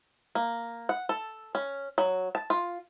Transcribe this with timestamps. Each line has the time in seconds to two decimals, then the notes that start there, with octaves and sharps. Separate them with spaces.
0.35 A#3
0.89 F#5
1.09 A4
1.55 C#4
1.98 F#3
2.35 A5
2.50 F4